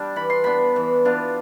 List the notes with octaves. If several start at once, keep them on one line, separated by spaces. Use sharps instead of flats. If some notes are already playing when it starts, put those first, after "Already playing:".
Already playing: G3 D4
E3 B5
C6
B3 D4 B5
E3
B3 D4 F4